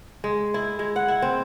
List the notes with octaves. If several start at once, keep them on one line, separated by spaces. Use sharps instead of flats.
G#3
E4
G#3
F#5
E4
C4